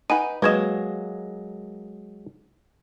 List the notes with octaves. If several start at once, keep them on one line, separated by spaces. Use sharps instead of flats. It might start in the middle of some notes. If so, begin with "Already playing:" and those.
D#4 B4 F#5 G#5 D#7
F#3 G#3 A#3 B4 C#5 D#5 G#6 E7